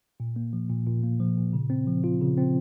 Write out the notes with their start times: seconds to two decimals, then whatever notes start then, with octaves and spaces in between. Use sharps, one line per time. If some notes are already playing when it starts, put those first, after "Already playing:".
0.20 A#2
0.36 A#3
0.53 F3
0.70 A#2
0.87 A#2
1.03 A#3
1.20 F3
1.37 A#2
1.53 C#3
1.70 C4
1.87 F3
2.04 F4
2.21 C#3
2.38 C4